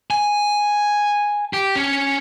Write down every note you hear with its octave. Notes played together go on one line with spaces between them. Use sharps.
G#5
G4
C#4